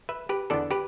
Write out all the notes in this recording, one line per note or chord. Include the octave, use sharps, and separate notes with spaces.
B4 E5
G4 B4
E2 D3 B3 D4 A4 D5
G4 B4